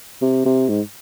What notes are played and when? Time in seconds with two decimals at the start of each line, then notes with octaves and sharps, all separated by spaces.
0.22 C3
0.45 C3
0.69 G#2